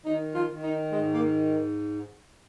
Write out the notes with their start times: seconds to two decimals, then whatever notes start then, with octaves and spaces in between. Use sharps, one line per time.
0.05 D#3 D#4
0.34 F4
0.49 D#3
0.63 D#4
0.92 G#2 G#3
1.14 A#3